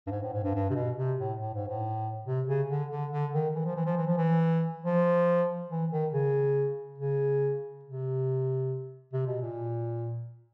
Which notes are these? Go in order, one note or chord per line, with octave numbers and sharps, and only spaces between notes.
G2
G#2
A2
G#2
G2
G2
C3
B2
C3
A2
A2
G#2
A2
C3
C#3
D3
D3
D3
D#3
E3
F3
E3
F3
E3
F3
E3
F3
E3
D#3
C#3
C#3
C3
C3
B2
A#2